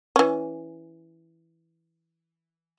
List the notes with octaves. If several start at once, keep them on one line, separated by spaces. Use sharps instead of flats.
E3 C#4